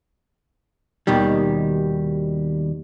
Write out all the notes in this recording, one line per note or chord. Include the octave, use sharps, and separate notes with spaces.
D#2 B2 D#3 G3